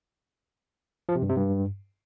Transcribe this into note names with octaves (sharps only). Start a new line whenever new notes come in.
F3
C3
G2
C3
G2